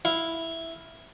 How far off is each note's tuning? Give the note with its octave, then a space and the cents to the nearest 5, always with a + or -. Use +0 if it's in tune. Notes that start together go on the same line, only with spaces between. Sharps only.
E4 +0 F5 +0